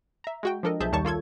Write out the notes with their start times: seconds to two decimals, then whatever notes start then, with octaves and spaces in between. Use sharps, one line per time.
0.24 E5 A#5
0.43 G#3 F#4 G5
0.63 F3 D4 A4 A#4 D#5
0.80 B1 F3 G#4 E5 A5 G6
0.92 D#2 D#3 G3 C#5 A5 C#6
1.05 A#3 F4 A4 G#6